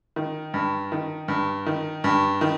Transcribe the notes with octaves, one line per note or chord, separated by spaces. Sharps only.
D#3
G2
D#3
G2
D#3
G2
D#3